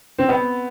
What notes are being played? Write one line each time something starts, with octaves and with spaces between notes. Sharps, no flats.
C4
B3